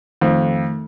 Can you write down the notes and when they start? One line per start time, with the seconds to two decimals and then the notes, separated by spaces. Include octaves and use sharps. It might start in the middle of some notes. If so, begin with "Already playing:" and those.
0.21 F2 D#3 A3